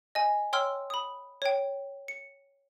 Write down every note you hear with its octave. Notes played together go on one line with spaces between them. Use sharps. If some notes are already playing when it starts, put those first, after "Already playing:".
D#5 G#5
C#5 G5 C6 E6 F6
B5 D#6
C#5 G5
C#7